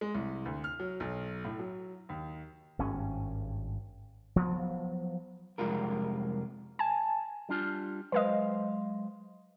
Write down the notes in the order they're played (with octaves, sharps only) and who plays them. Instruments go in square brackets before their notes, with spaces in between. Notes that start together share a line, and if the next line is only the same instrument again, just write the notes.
[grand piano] G#3
C2
D2
F6
F#3
B1
A2
F#3
D#2
[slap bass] G#1 G2 C#4
F3 F#3 B3
[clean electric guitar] C2 F2 G#3 F4 A#4
[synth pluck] G#5 [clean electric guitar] A5
[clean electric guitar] G3 D4 F4
[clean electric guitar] F#3 G#3 F5 [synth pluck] B4 C5 D#5